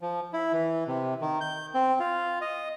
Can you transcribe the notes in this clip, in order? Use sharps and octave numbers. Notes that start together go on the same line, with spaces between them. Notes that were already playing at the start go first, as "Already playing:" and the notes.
F3
E4
E3
C3
D#3
G6
C4
F4
D#5